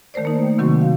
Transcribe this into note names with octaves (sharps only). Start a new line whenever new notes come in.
D#3 A3 A#4 C5 D5
A#3 D#4
G5
C3 D#3 F#3 C4 F#4 C#6
F5